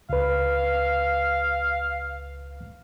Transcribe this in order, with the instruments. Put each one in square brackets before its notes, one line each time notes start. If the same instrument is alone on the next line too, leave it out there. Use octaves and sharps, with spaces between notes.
[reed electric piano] C#2 B4 [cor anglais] F5